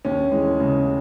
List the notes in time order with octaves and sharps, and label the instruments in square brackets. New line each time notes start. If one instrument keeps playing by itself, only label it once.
[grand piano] D#2 [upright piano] C#4
[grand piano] E3 [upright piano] G#3
[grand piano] C#3 [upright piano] G#3